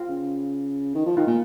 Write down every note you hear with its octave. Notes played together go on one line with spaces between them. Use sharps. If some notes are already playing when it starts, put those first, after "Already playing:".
Already playing: F4
C#3
D#3
F3
D#3 F4
A#2